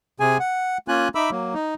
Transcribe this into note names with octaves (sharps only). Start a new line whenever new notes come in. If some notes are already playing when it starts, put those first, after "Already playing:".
C3 G#4 G#5
F#5
A#3 C#4 F4 G#5 F#6
D#4 E5 B5 D6 E6
F#3 A#3
D#4